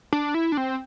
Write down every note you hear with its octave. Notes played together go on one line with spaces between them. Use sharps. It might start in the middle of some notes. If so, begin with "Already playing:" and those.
D4
E4
D4
C4